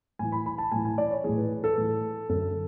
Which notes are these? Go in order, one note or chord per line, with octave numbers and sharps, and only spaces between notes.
A2 E3 G#5
B5
B5
A5
A2 E3 G#5
G#5
D5
C#5
A2 E3 G#4
B4
A4
A2 E3
F#2 D3 A4